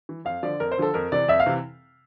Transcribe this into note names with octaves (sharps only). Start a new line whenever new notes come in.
E3
F2 F5
D3 F3 D5
F2 A#4
C5
D3 F3 A4
F2 A#4
C3 E3 D5
F2 E5
F5
C3 E3